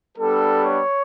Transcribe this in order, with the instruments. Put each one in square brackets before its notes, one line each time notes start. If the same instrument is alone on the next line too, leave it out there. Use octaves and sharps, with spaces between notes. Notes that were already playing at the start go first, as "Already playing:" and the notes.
[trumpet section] G3 B3 D4 A4
C#5